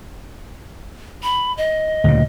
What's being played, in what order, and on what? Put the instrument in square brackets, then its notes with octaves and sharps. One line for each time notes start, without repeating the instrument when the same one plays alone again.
[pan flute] B5
D#5
[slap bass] D2 A#2 C#3